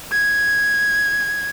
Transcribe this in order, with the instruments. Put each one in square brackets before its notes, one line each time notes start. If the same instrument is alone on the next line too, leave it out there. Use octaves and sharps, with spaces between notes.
[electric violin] G#6